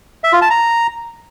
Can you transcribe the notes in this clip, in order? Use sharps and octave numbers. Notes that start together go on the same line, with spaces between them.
E5
F4
A5
A#5